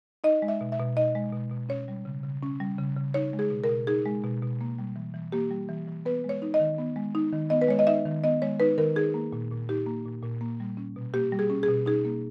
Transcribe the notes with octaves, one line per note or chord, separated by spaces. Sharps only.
D#4 D#5
G#3
E5
B2
E5
B2
D#4 D#5
G#3
B2
B2
C#4 C#5
G3
C#3
C#3
C#4
G3
C#3
C#3
D#4 C#5
G#3
G#4
B2
A#4
B2
D#4 G#4
G#3
B2
B2
A#3
G3
E3
E3
A#3 G4
G3
E3
E3
B3 B4
G#3
C#5
D#4
D#5
D#3
B3
G#3
D#4
D#3
B3 D#5
B4
G#3 C#5
D#5
D#4 E5
D#3
B3 D#5
G#3 C#5
D#4 B4
D#3 A#4
D#4 G#4
A#3
A#2
A#2
D#4 G4
A#3
A#2
A#2
A#3
G3
C#4
B2
A#3 G4
G3
G#4
C#4
G#4
B2
D#4 G#4
A#3